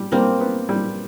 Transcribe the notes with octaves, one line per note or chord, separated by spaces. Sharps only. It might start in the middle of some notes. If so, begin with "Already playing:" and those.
Already playing: G3
G3 A#3 C4
B3
G3